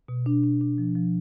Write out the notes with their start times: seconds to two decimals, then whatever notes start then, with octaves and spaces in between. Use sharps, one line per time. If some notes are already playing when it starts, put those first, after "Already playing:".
0.08 B2
0.26 D4
0.44 D4
0.61 D4
0.78 F3
0.95 F3